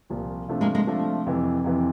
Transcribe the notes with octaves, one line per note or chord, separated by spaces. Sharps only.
C2 A#2 F3
C3 F3 A3 D4 F4
G#3 A#3
G#3 A#3
C3 F3 A3 D4 F4
F2 C3 E3
F2 C3 E3